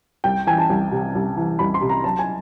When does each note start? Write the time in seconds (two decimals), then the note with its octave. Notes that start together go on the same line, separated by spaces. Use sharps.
0.24 C2 G5
0.47 E3 G#5
0.58 A5
0.70 C2
0.92 C3
1.15 C2
1.37 E3
1.59 C2 B5
1.74 C6
1.81 C3
1.89 A#5
2.04 B1 A5
2.19 G#5